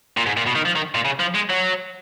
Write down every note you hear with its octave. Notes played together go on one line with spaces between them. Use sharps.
A#2
G#2
A#2
B2
D#3
F3
D#3
A#2
C#3
F3
G#3
F#3